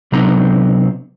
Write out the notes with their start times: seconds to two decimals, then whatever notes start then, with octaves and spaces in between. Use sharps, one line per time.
0.12 C3 F#3 B3 C4 D4 A#5